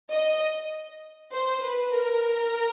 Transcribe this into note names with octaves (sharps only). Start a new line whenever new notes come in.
D#5
C5
B4
A#4